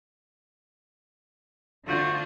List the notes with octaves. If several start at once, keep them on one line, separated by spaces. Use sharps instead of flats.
D3 A3 D4 F4 F#4 C5